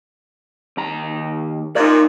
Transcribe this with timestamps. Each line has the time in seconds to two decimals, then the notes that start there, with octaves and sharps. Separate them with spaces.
0.77 D#2 A#5
1.76 A#2 A#3 D#4 D5